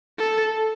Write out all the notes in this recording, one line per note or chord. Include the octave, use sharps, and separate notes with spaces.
A4